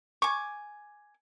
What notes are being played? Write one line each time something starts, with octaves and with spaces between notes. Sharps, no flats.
G#5 C#6 D6